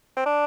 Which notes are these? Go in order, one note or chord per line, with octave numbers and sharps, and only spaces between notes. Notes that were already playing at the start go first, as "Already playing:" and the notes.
C4
D4